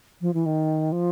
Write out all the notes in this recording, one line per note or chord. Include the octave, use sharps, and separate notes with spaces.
F3
E3
D#3
F3